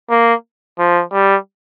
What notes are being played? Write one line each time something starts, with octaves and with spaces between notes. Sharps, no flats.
A#3
F3
G3